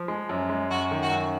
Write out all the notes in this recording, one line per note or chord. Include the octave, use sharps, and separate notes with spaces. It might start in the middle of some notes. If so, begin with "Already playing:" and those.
Already playing: F3
G#3
F#2
G#3
F#2 F#4
D#3
F#4
F#2